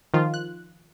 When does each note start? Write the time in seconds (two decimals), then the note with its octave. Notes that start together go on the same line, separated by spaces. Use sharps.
0.14 D#3 F3 F4
0.34 F#6